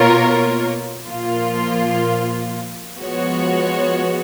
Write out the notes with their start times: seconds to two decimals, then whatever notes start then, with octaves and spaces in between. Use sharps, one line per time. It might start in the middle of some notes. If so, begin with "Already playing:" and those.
Already playing: B2 A#3 F4 A#4 C#5
1.07 A#2 F3 A#3 F4
2.98 F3 G#3 B3 F#4 C#5